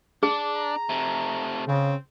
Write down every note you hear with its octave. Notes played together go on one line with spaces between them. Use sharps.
D4 G#4
A#5
C3 A3
C#3 C4